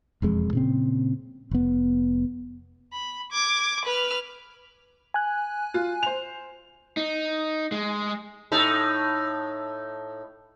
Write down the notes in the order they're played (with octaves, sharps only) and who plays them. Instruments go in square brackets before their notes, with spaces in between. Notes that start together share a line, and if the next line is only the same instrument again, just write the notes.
[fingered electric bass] E1 F2 G#3
A#2 C#3 C4
F1 B3
[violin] B5
D6 G#6
B4 F6
[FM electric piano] G#5 F#6
[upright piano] F4
C5 F7
[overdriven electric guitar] D#4
G#3
[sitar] A2 D#4 A4